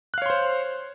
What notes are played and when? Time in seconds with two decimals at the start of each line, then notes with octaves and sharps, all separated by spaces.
0.14 F#6
0.18 F5
0.22 C#5
0.26 C6
0.30 C5